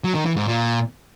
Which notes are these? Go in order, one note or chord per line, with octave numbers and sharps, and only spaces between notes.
F#3
D#3
E3
G#2
A#2